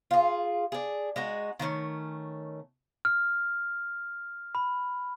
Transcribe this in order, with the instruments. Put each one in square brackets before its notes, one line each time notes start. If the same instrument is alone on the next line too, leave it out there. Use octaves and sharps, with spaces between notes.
[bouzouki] F4 G#4
D4 G#4
G#3 D#4 F#4
D#3 A3 C4 C#4
[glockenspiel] F6
B5